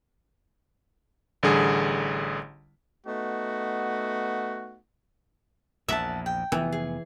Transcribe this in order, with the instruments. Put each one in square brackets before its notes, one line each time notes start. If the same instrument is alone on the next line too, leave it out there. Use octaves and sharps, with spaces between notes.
[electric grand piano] A1 D3 G3 G#4
[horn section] A3 B3 D#4 F#4
[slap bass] A#1 E2 [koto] E5 [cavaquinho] F#5 A5
[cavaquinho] G5
[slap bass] F1 B3 [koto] E3
[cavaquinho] G#4